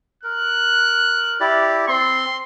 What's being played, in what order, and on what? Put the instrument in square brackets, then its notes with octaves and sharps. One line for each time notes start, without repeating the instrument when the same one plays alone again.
[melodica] A#4 [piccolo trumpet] F#6
[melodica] E4 G4 D5
[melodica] C4 [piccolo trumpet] C6